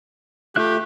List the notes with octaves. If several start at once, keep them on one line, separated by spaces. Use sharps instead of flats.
A3 F4 G4 E5 F#6